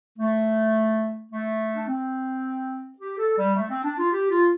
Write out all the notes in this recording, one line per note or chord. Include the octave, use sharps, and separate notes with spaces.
A3
A3
D4
C4
G4
A4
G3
A3
C4
D4
F4
G4
F4